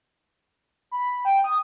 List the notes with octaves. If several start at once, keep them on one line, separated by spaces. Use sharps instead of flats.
B5
G5
D#6